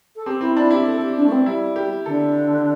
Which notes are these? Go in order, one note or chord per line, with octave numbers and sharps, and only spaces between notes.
A4
C4 G4
C4 E4
D4 E4
E4 G4
A4
G4
D4
A3
C4
G3 E4
G4
D3 A4